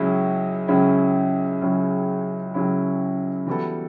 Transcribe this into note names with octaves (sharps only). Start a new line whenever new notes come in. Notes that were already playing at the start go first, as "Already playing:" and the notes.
Already playing: C#2 C#3 F#3 C#4 E4
C#2 C#3 F#3 C#4 E4
C#2 C#3 F#3 C#4 E4
C#2 C#3 F#3 C#4 E4
E3 G3 B3 F#4 A4